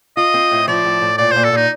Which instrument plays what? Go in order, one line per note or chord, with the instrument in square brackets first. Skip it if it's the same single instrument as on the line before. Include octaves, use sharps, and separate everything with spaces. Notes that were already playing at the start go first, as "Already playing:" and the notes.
[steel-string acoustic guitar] F4 [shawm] D#5
[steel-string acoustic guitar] C4
A2
[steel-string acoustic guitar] F3 [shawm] D5
[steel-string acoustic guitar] A2
A2
[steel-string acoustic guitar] A#2 [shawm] D5
[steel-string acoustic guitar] A#2 [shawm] C5
[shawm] A4
[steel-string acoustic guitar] A#2 [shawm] D#4